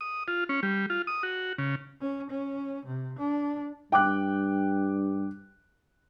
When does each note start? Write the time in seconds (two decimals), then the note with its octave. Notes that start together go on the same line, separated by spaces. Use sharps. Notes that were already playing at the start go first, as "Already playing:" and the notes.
0.01 D#6
0.28 F4
0.49 C#4
0.63 G3
0.90 F4
1.07 D#6
1.23 F#4
1.58 C#3
2.01 C#4
2.30 C#4
2.86 C3
3.19 D4
3.92 G2 G5 D6 F#6